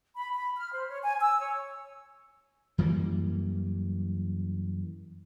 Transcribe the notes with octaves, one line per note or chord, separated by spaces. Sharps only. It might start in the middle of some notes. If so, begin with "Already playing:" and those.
B5
B5
F6
C5
C#5
G#5
E6
C#5
F#2 E3 G3 A#3